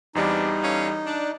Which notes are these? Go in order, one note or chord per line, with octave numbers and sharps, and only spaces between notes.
E2 C3 E3 G3 B3 D4 D#4
C#4 A4 F5
D4